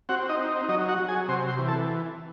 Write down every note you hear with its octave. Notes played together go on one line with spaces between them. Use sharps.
C4 F#4 F#5
D#4 D#5
D#4
F#3 D#4 D#5
F#4 F#5
F#3
G#4 G#5
C3 C5 C6
C5 C6
E3
A4 A5